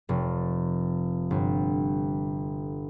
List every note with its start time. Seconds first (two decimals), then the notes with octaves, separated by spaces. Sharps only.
0.09 F1
1.31 G1